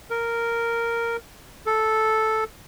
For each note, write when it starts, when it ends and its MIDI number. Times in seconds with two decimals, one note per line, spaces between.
0.10 1.17 70
1.66 2.44 69